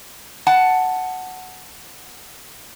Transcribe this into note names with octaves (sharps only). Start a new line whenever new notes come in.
F#5 A5